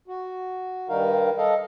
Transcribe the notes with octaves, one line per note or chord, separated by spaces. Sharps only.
F#4
G2 D#3 G3 D#4 A#4 F5
A4 D#5 F5